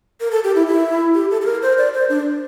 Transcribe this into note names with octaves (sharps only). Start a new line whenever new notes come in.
A#4
A4
G4
E4
E4
G4
A4
A4
A#4
C5
D5
C5
D4